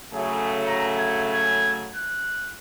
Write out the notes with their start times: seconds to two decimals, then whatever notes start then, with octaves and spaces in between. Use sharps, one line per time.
0.14 C#3 F#3 A3 G#4
0.67 A#5
0.98 G#6
1.34 G#6
1.96 F#6